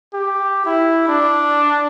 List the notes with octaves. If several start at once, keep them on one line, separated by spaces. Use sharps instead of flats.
G4
E4
D4